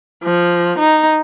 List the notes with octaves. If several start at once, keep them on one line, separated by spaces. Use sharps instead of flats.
F3
D#4